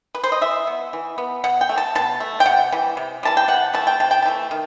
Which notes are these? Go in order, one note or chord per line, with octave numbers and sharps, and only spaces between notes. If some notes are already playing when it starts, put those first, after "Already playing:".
B4
C5
D#5
E3 E5
B3
E3
B3
B2 F#5
G5
A3
A5
B2 A5
A3
G5
C3 F#5
E3 G3
C3
E3 G3 A5
G5
C3 F#5
E3 A3 A5
G5
C3 A5
G5
A5
E3 A3
D#3